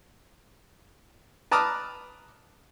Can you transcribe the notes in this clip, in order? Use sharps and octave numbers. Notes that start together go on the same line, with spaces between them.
B4 A5 A#5 D6 D#6 F6